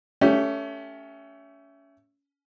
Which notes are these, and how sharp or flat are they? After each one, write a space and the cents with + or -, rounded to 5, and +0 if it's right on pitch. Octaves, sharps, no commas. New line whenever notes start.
A3 +10 C#4 +25 G4 +0